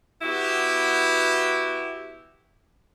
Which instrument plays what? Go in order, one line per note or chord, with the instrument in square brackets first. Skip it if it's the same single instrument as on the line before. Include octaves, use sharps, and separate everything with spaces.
[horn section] B3 E4 F#4 G4